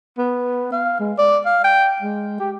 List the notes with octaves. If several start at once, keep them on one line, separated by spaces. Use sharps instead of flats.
B3
F5
G#3
D5
F5
G5
G#3
G4